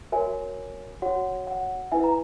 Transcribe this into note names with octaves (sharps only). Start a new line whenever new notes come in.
F#4 A#4 C#5 E5 G#5
F#4 C#5 F#5
F#5
E4 B4 E5 G#5
A#5